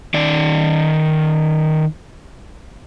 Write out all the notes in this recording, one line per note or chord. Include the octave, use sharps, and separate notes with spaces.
D#3 D5